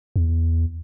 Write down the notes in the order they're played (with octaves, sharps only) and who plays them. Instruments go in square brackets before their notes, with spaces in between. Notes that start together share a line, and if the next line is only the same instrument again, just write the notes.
[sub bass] E2